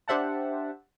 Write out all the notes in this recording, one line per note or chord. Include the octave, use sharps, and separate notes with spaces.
D4 G4 C5 E5 F#5 A5